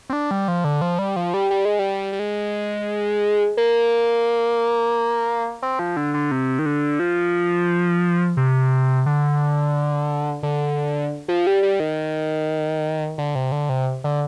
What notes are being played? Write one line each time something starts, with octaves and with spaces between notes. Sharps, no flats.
C4
D4
G3
F3
D3
F3
G3
F3
G3
G3
G#3
G3
G3
G#3
A#3
C4
F3
D3
D3
C3
D#3
D3
F3
C3
D3
D3
F3
G3
G3
D#3
D3
C3
D3
C3
D3